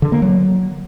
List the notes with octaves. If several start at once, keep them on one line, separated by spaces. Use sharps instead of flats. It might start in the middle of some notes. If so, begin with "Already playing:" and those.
D3
A#3
F#3